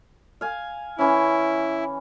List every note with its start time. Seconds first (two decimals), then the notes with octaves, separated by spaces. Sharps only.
0.41 F5 G#5
0.98 E3 C#4 E4